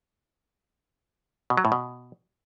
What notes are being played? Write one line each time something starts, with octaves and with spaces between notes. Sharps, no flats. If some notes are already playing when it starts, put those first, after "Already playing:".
B2
F#3
A2
B2